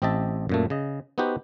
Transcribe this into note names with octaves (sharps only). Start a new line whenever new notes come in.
A1 C4 G4 D#5 E5 A5
F#2 A#2 A3
C#3 D#5
B3 D#4 F#4 G4 C5